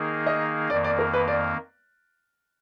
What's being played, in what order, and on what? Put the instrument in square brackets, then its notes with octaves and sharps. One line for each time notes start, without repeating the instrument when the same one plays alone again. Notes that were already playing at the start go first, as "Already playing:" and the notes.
Already playing: [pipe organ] D#3 A#3 D#4 G#4
[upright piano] D#5
[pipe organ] F2 D#3 A#3 [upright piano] D5
[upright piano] D5
A#4
B4
D5